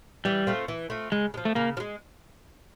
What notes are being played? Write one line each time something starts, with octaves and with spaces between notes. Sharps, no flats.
E3 G3
A3 C4 F4
E3
A3 C4 F4
C#3 G#3
G#3
F3
A3
C#3 A#3
F3
G#3